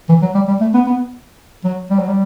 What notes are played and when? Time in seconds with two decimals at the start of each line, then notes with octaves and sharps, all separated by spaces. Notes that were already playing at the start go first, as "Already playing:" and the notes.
0.09 E3
0.22 F#3
0.35 G3
0.48 G3
0.61 A3
0.74 B3
0.87 B3
1.64 F#3
1.90 G3
1.99 F#3
2.08 G3